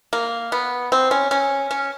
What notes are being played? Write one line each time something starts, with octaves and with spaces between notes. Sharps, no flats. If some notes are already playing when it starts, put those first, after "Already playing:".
A#3
B3
C4
C#4
C#4
C#4